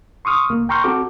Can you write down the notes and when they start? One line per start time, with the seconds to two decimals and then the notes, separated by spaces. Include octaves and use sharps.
0.25 C6 C#6 D#6 F6
0.50 C#2 A#3
0.69 G5 A#5 C6 C#6 F6 G6
0.84 C4 F#4 A4 D6